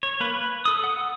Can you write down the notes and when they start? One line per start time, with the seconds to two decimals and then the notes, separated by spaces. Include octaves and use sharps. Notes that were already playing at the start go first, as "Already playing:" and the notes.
0.03 C#5
0.20 A#3 B4
0.32 B4
0.65 A4 D#6
0.84 F#5 D#6